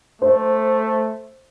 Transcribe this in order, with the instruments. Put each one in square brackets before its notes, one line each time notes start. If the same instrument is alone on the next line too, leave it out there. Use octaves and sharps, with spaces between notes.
[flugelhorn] A3 [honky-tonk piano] C5